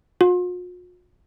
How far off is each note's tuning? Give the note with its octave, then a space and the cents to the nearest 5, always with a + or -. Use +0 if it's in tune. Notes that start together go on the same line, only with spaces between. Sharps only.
F4 +45